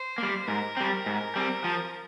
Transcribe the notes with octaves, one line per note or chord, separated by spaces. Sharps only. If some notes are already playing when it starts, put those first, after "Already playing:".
Already playing: C5
G3 A#3
G#2 A#4
G3 C4
G#2
G3 C4
F3